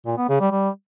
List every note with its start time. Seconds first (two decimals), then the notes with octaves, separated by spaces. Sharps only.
0.06 A#2
0.18 B3
0.29 C#3
0.40 G3
0.51 G3